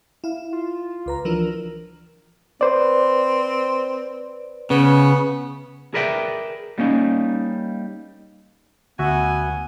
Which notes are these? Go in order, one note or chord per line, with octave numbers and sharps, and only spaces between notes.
E4 F5
F4
C#2 B4 A#5
E3 F3 D4 A#4
C4 B4 C5 D5
C#3 B3
G#4 A#4 B4 D5 E5 G5
G3 A#3 C#4 D#4
D2 B3 F#4 E5 G#5